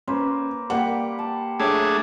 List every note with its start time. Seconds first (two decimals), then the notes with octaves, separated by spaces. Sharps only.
0.08 A#3 C#4 B4 C5
0.70 G3 A#3 G4 F#5
1.19 A5
1.60 F#3 A3 D4 G#4 C#5 E5